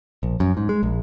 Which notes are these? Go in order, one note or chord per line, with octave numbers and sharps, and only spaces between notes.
A#1
F#2
G#2
G#3
A#1